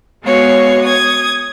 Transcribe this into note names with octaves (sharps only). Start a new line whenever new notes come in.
G#3 B3 F#4 C#5 F5
D#6 G#6